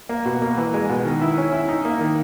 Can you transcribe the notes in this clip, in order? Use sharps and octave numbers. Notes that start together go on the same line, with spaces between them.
A#3
B2
A#3
E3
G#3
B2
D#3
E4
C#4
E4
D#4
A#3
D#3